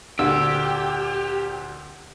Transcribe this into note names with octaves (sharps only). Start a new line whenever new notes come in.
D2 A#2 D3 G4 E6